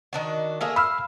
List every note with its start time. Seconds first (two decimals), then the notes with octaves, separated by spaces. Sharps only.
0.13 D#3 D4 F#4
0.61 A3 A#3 G#4
0.76 F5 B5 E6 F6